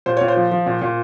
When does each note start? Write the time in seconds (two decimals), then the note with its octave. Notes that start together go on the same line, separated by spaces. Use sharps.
0.06 A#2 C5
0.17 A#2 C#5
0.28 C5
0.36 F3
0.51 F3
0.66 A#2
0.81 A#2